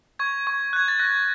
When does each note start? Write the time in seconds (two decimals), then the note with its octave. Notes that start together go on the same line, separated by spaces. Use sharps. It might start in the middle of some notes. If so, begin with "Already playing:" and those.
0.19 C#6 G#6
0.47 C#6
0.73 F#6 G#6
0.88 A6
0.99 F#6 A#6